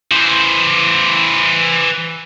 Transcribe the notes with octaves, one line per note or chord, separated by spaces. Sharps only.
E3 C5